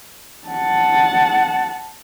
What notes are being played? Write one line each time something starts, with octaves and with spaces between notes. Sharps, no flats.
F#5 A5